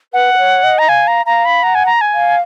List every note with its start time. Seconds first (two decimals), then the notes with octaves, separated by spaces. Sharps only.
0.13 B4 F#5
0.34 B4
0.38 C#5
0.63 D#5
0.79 A#5
0.88 F5 G#5
1.07 A#5
1.26 F5 A#5
1.45 B5
1.63 F#5 A#5
1.75 G#5
1.86 A#5
2.01 G#5
2.13 F5